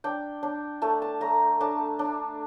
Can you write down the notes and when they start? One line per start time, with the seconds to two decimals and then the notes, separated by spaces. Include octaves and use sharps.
0.04 D4 G5
0.43 D4
0.82 A3 A5
1.02 A5
1.21 A3 A#5
1.61 D4 A5
1.99 D4